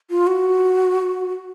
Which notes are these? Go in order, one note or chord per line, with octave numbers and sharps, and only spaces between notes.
F4
F#4